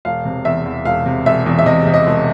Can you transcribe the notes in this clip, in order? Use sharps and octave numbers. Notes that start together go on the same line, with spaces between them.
E1 F5
C3
E2 E5
E2
E1 F5
C3
E1 E5
E2
E5
C3 D#5
C3
D#5
E1